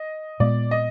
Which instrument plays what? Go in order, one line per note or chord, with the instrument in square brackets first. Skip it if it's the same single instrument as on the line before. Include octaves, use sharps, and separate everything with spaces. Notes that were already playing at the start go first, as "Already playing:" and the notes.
Already playing: [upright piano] D#5
[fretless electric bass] A#2 G#3 B3 [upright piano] D5
[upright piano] D#5